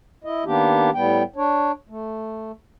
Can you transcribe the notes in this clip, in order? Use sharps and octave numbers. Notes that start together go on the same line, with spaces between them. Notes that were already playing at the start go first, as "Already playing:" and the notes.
E4 D#5
D#3 A#3 B3 D4 G4
A2 G3 B3 G5
D4 C#5
A3